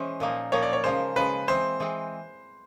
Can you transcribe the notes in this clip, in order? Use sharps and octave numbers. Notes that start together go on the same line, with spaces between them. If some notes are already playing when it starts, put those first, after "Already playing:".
Already playing: E3 G#3 C#4 C5
A#2 F3 A#3 D#4
A#2 F3 A#3 D#4 C#5
D5
C#5
C#3 F3 G#3 C5
C#3 F3 G#3 B4
E3 G#3 C4 C5
E3 G#3 C4